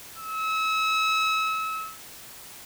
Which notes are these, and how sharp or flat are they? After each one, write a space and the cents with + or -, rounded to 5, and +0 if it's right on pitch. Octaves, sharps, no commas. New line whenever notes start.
E6 -35